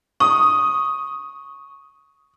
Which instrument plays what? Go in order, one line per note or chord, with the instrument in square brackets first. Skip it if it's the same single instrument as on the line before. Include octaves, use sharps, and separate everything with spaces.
[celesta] C#6 [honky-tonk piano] D#6